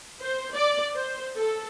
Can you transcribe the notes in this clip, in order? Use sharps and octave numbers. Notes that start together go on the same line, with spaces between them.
C5
D5
C5
A4